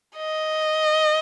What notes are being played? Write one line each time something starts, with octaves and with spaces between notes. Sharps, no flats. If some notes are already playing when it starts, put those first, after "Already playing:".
D#5